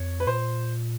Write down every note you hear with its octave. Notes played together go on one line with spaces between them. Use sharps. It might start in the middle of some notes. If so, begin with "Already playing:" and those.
Already playing: F2 C#5
B4
A#2 C5